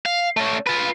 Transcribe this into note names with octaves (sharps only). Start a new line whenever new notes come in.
F5
A3 C#4
F4 B4